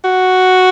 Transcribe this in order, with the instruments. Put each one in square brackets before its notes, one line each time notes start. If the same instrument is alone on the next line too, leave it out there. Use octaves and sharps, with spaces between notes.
[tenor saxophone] F#4